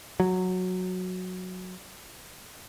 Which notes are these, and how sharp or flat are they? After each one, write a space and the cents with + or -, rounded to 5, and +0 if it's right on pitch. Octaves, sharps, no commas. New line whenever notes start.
F#3 -10